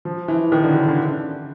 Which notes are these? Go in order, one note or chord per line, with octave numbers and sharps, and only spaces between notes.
F3
E3
D#3
D3
C#3
D3